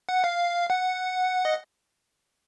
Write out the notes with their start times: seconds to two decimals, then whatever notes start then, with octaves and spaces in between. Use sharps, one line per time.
0.09 F#5
0.24 F5
0.70 F#5
1.45 D#5